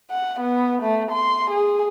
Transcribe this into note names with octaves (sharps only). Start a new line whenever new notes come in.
F#5
B3
A3
C6
G#4